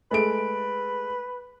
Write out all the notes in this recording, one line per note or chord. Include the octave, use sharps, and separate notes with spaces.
G#3 A3 B4 D7